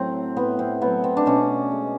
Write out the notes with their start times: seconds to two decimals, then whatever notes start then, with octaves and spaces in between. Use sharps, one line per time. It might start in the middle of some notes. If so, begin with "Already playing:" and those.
Already playing: A2 F#3 A3 C4
0.36 A2 B3
0.59 C4
0.81 F#3 A3 B3
1.04 C4
1.17 D4
1.26 B2 C#4
1.72 G#3